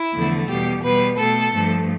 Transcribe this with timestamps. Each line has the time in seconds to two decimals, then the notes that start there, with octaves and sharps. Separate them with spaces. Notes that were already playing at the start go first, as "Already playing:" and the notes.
Already playing: E4
0.13 E2 D3 F3 A3
0.48 E2 B2 G3 G4
0.83 B2 G3 B4
1.18 B2 A3 A4
1.54 G2 F3 A3